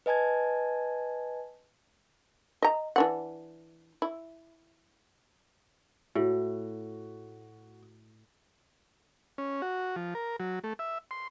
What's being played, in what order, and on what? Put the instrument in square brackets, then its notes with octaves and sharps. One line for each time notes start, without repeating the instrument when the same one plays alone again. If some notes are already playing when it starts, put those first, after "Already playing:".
[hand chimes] B4 D#5 G#5 A5 G#6
[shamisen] D#5 A#5
E3 D4 F#5
E4
[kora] A2 [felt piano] F#4
[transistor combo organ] C#4
F#4
F3
A#4
F#3
A3
E5
C6